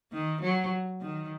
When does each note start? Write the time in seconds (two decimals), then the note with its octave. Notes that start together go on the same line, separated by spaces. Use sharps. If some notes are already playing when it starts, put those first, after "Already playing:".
0.12 D#3
0.42 F#3
1.01 D#3